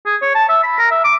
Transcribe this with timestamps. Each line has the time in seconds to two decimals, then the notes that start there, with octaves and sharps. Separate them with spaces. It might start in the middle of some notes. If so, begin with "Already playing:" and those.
0.06 G#4
0.22 C#5
0.35 A5
0.49 E5
0.64 B5
0.78 A#4
0.91 E5
1.04 D6